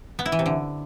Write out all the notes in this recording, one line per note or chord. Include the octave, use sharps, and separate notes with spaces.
B3
E4
E3
C3
D3